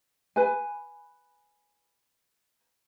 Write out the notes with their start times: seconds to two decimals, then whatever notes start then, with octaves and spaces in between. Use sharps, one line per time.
0.36 B4 G#5